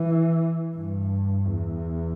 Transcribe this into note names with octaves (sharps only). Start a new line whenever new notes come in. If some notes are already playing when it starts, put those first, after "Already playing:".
Already playing: E3
G2
E2